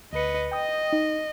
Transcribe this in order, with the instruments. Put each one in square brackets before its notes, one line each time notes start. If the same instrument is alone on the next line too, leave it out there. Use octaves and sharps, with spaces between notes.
[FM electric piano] D2 C#7 [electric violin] B4 D#5
[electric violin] D#5 [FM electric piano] G5 D#6
[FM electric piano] D#4